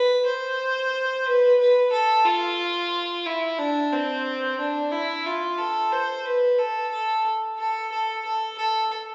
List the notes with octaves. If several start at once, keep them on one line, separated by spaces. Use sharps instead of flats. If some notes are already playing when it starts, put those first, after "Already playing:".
Already playing: B4
C5
B4
B4
A4
F4
E4
D4
C4
D4
E4
F4
A4
C5
B4
A4
A4
A4
A4
A4
A4